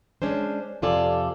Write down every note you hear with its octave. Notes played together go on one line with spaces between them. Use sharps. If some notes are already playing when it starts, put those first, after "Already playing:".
G#3 C#4 D4 C5
F2 C3 F4 A4 D5 G#5